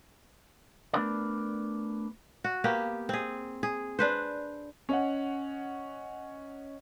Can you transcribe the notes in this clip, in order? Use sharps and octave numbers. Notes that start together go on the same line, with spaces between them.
A3 B3 D4 A#4 B4 D5
F#4
A#3 B3 G4
C4 G#4
G#4
D4 B4 C5
C#4 D#5 F#5